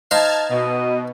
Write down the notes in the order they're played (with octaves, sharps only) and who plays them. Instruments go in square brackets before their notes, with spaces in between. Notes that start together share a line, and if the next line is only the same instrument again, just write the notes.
[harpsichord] D#4 C5 F5 [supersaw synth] A5 F6 G#6
[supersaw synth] B2 [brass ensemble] D#5